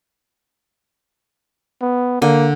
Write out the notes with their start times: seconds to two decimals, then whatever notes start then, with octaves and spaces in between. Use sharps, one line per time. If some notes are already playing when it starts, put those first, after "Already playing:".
1.81 B3
2.22 D3 A#3